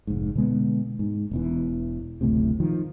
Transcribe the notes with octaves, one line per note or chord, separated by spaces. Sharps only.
F1 G#2
B2 D3 G#3 B3
G#2
E1 E2 E3
F#1 D2 A2 C3
D#3 F3